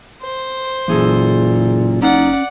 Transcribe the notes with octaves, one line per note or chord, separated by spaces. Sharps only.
C5
F#1 A#2 E3 G#4 A4
C#4 D#4 D5 F#5